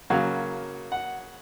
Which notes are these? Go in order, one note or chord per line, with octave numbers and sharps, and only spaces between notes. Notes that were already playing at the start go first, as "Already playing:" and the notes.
C#3 F#3 A#3 F5
F#5